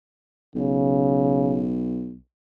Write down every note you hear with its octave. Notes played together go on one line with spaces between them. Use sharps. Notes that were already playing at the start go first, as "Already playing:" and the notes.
B1 C#3